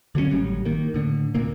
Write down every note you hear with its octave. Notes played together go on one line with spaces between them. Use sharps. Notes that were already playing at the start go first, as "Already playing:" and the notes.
D3 F#3 G#3 C#4
G#1 A2 F#3 G3
D#3 A#3
A2 D3
D2 A#2 A#3